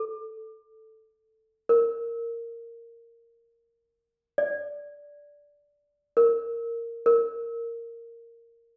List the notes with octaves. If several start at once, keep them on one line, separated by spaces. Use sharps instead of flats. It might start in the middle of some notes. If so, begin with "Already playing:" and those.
Already playing: A4
A#4
D5
A#4
A#4